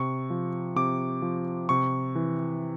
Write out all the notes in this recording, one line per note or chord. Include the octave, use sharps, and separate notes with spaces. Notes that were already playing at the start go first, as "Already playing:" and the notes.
Already playing: C3 C#6
F3
C3 D6
F3
C3 C#6
E3